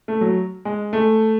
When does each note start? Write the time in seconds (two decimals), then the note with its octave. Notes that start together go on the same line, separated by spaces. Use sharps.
0.08 A3
0.21 F#3
0.65 G#3
0.93 A3